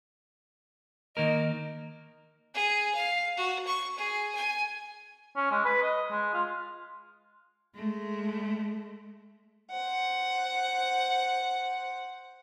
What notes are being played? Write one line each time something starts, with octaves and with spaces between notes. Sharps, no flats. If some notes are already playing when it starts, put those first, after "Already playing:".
D#3 A#3 A#4 D#5
G#4
F5
F#4
C#6
G#4
G#5
C#4
G#3
B4
D#5
G#3
F4
G#3 A3
C5 F#5